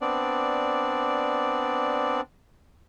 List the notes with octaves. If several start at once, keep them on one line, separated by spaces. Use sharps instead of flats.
B3 C4 D4 D5